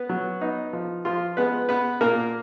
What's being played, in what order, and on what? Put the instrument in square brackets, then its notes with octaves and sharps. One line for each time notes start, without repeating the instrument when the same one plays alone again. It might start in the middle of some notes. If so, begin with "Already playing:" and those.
Already playing: [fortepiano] B3 B4
F#3
B3 D#4
F3
F3 F4
G#3 B3 B4
B3 B4
A#2 A#3 A#4